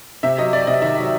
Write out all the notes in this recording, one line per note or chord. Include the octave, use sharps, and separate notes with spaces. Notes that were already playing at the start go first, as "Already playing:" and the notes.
C3 E5
F#3 D#5
F#3 D5
C3 D#5
D#3 E5
F#3